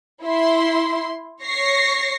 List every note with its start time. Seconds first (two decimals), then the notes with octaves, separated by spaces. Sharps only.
0.24 E4 C6
1.41 C#5 C#6 A#6 C7